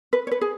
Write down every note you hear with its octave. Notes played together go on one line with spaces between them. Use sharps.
B4
C#5
B4
G#4